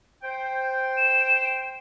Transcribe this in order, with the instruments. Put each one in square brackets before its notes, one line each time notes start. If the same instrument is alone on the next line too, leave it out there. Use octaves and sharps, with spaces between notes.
[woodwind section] C5 G5
[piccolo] E7